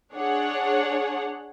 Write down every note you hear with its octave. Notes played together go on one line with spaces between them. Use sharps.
D4 G#4 C#5 F#5